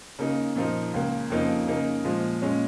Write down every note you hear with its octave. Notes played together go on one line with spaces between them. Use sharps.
C#3 A#3 D#4
A#2 F3 A#3 D#4
C#2 C#3 A#3
F2 C#3 F3 A#3 D#4
C#3 A#3 D#4
A#2 F3 G#3
A#2 G#3 C#4